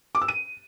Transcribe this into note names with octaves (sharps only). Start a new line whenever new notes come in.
D6
E6
D#7